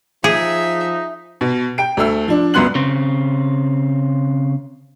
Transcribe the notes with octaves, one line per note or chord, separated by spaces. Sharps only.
F3 D#4 G#4 E5
B2
G5 D7
D2 A3 E6
F3 D4
C#2 F#2 B3 C6 F#6 F#7
C#3 C4